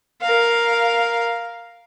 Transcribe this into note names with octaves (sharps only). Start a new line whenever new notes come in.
A#4 F5